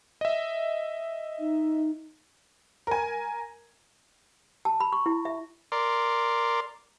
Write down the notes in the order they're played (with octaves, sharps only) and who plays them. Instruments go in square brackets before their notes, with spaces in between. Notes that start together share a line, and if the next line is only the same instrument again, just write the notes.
[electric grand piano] D#5 E5
[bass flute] D#4
[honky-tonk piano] A#4 G#5
[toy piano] A5
B5
C#6
E4
E5
[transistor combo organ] A#4 D5 C6